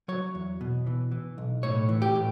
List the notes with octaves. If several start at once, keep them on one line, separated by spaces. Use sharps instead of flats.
F#3 C#5
E2
B2
E3
E3
B1
A2 C#5
E3
G4
A2